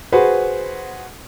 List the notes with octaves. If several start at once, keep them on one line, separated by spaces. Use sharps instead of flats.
F#4 G#4 B4 C5